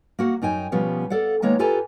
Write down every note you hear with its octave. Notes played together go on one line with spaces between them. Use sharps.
A#3 F#4 F#5
F#2 D#4 G5 G#5
B2 F3 G3 B3 C#4
A4 D5 F5 F#5
D#3 G#3 A#3 B3 C#5 A#5
F4 G4 A4 B4 G#5 A#5